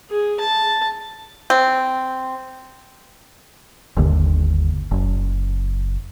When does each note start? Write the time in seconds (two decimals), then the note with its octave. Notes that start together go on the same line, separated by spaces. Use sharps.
0.10 G#4
0.40 A5
1.50 C4
3.97 G1 D#2 D3
4.91 F#1